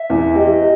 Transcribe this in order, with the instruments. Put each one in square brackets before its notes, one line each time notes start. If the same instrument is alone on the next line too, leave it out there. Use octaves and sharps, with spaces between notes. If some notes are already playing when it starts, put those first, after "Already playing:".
Already playing: [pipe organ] E5
[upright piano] E2
[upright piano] G4 [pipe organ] D#5